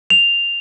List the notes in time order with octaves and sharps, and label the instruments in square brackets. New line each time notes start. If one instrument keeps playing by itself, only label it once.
[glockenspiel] F7